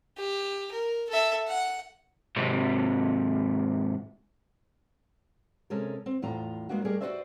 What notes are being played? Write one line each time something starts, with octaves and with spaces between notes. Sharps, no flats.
G4
A#4
A4 E5
F#5
G#2 C3
C3 G#3 C#4 A4 A#4
C4
E2 A2 F3 F4 A#5
G#3 A#3 B3 D4 F#4
G3 A3 G4 G#4 A#4 D#5
F#4 G#4 B4 C5 D5 E5